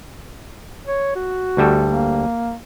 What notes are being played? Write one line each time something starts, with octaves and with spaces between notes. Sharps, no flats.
C#5
F#4
D2 G3 A4
A#3